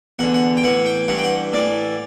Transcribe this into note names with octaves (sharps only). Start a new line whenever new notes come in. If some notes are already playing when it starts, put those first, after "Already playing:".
E2 D3 F#5
F#5
G5
A2 E3 F#5
G5
G2 E3 F#5
G5
F#5
A2 E3 D5